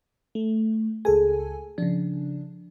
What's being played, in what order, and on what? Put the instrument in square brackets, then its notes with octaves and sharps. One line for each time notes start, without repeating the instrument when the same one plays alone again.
[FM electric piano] A3
[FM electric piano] C#2 A4 G#5 [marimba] G#4
[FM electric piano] C#3 D4 [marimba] F3